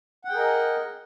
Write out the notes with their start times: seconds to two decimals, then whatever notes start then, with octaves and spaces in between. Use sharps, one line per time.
0.25 F#5
0.28 G5
0.32 G#4
0.35 A#4
0.39 D#5